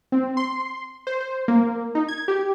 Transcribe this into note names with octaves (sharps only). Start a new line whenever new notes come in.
C4
C6
C5
C5
A#3
D#4
G#6
G4